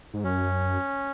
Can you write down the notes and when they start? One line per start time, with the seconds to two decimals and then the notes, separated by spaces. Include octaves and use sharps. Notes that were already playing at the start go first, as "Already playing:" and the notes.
0.14 G#2
0.24 F#2 C#4